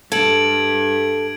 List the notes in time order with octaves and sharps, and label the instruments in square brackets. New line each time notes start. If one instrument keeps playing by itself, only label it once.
[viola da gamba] G2 [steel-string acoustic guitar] A4 [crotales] G#6 D7 F#7